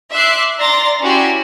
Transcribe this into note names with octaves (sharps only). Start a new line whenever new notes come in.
E5 C6 D6 F#6 C7
D5 A#5 C6 A6 A#6
C#4 E4 F#4 G4 C6